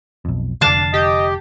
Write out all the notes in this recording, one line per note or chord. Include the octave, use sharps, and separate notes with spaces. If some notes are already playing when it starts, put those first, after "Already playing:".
B1 F2
F1 D3 D4 F5 A5
G4 D#5